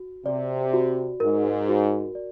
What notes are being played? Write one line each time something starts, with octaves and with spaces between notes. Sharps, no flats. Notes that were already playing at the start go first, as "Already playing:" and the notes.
Already playing: F#4
C3 D5
F#4
G#2 A#4
F#4
D5